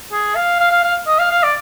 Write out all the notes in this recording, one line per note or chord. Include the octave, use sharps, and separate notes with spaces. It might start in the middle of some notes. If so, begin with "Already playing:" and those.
G#4
F5
F5
F5
F5
D#5
F5
F5
D5